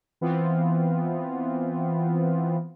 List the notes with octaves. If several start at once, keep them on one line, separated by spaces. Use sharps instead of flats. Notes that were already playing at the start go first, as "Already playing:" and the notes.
E3 B3 C4 F4